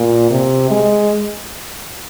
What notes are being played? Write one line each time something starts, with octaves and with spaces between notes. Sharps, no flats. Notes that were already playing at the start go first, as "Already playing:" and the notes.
Already playing: A#2
C3
G#3